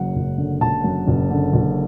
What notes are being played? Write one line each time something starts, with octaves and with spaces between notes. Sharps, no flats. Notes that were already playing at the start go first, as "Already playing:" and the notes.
Already playing: F#1 F#2 F#5
F#1
D3
F#1 A5
F#2
F#1
D3
F#1